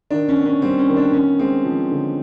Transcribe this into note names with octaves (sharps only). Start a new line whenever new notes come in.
D#3 D4
C#4
B3
C#4
G3 C4
C#4
D#3
D4
B3 C#4
G#3 C4
F3
D3